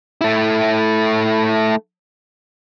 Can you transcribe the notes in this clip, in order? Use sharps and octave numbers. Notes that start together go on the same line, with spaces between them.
A3 E4